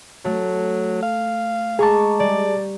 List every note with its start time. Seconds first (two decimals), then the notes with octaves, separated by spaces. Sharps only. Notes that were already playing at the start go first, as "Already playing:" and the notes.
0.25 F#3 A3
1.02 F5
1.79 G#3 G#4 A5 A#5 C#6 D6
2.20 G3 D5